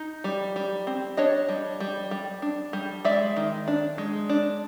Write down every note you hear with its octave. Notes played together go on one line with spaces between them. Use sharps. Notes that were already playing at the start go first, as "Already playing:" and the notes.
Already playing: D#4
G3
G3
C4
D4 C#5 D#5
G3
G3
G3
D4
G3
G#3 D5 E5
D#3
D4
G#3
D4